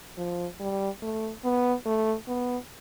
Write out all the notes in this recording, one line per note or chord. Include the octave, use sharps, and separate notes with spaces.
F3
G3
A3
B3
A3
B3